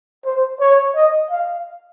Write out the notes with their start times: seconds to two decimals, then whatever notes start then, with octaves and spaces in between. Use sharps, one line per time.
0.25 C5
0.60 C#5
0.96 D#5
1.30 F5